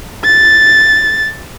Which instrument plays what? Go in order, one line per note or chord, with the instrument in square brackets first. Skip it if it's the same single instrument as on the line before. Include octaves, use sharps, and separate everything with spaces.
[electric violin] A6